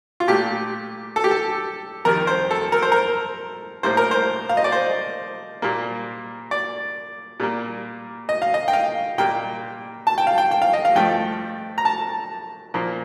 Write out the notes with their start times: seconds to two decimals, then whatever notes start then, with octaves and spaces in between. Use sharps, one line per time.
0.20 F4
0.28 A#2 A3 G4
1.16 A4
1.24 G4
1.31 A4
2.05 F2 D#3 G3 A#4
2.27 C5
2.51 A4
2.72 A#4
2.82 C5
2.92 A#4
3.83 A2 G3 A#3 C5
3.97 A#4
4.11 C5
4.49 F5
4.57 D#5
4.64 D5
4.72 C5
5.62 A#2 G3 A#3
6.51 D5
7.40 A#2 G3 A#3
8.29 D#5
8.42 F5
8.54 D#5
8.68 G5
8.73 F5
9.18 A#2 G3 A#3 G5
10.07 A5
10.18 G5
10.27 F5
10.38 G5
10.51 G5
10.62 F5
10.73 D#5
10.85 F5
10.95 G2 F3 A3 G5
11.78 A#5
11.85 A5
12.74 A#2 F3 A#3